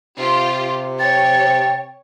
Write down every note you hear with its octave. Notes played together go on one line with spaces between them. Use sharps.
C3 F4 G4
C#5 G5 A6